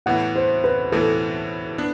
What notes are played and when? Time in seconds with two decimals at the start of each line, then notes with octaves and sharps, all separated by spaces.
0.06 A2 E3 B3 F#5
0.36 C5
0.64 B4
0.92 A2 E3 B3 A4
1.78 B3 D4